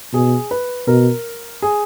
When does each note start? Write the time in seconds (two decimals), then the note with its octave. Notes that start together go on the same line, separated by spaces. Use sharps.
0.13 B2 G#4
0.51 B4
0.87 B2 A#4
1.62 G#4